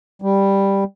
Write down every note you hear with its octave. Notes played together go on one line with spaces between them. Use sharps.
G3